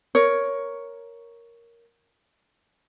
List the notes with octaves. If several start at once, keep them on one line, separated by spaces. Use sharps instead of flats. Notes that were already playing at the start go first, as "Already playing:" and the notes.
A#4 C#5